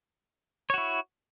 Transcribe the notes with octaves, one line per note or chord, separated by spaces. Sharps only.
E4 F#4 C#5